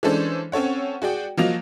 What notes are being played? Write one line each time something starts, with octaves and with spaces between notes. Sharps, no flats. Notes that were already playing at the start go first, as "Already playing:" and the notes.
E3 G#3 C#4 D4 A4 C5
C4 C#4 A4 C#5 F#5
F#4 G#4 D5 G5
F3 F#3 A#3 D#5 F7